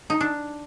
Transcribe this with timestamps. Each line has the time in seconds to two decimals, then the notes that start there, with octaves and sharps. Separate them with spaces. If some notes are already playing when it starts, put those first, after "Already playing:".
0.10 D#4
0.21 D4